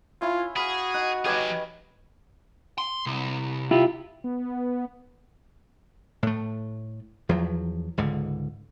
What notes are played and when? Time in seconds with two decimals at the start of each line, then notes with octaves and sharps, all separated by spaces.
0.22 C#4 E4 F4
0.56 F#4 G#4 F5 B5
0.94 D#4 F#5
1.25 F#3 D#4 G4 G#4 B4 C#5 F5 G#5
2.78 C6
3.06 C2
3.71 E4 F4 G4
4.24 B3
6.23 A2 A3
7.29 E2 F3 F#3
7.97 C#2 G#2 D3